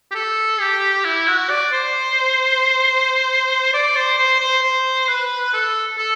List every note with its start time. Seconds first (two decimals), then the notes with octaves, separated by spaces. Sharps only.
0.11 G4
0.15 A4
0.60 G4
1.05 E4
1.28 F#4
1.50 D5
1.72 C5
3.74 D5
3.96 C5
4.18 C5
4.40 C5
4.62 C5
5.08 B4
5.53 A4
5.98 A4